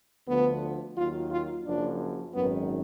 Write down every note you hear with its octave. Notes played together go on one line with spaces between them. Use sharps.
D2 D3 F3 B3
D#2 D#3 F#3 F4
F4
F#1 F#2 F3 D4
G#1 F#2 D#3 B3